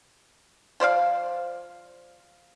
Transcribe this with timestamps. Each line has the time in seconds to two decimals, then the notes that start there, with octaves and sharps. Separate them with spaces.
0.80 F3 C5 D5 F5